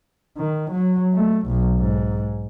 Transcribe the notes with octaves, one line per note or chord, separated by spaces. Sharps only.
D#3
F#3
A3
B1
G#2